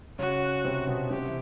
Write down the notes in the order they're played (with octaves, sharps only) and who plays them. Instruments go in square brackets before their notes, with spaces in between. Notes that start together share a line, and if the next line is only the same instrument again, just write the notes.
[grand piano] C#3 C#4 [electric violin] F#4
[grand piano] C3 C4
B2 B3
[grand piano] C3 C4 [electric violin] G4
[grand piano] E3 E4